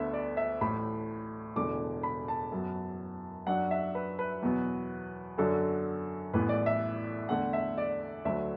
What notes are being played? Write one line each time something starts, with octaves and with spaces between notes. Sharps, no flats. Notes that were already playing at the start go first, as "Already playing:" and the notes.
Already playing: D2 D3 B3 D4 E5
D5
E5
A1 A2 A3 B5
E1 E2 D3 A3 D6
B5
A5
F#2 F#3 B3
F#2 F#3 D4 F#5
E5
B4
B4
E2 B2 F#3 B3
F#2 D3 F#3 D4 A4
A1 A2 E3 B3 B4
D5
E5
E2 D3 A3 F#5
E5
D5
D2 D3 F#3 E5